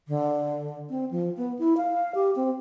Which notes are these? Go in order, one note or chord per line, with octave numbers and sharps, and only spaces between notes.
D3
C4
F3
B3
E4
F5
G4
C4